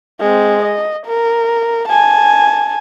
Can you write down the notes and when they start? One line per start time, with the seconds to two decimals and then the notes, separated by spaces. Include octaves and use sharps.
0.20 G#3 C4
0.62 D#5
1.06 A#4
1.88 G#5 A5